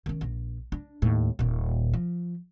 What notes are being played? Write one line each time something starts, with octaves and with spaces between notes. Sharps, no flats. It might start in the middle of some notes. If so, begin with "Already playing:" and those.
D#3 C#4
A#1
D4
D#2 A2
D#1 A#2
F3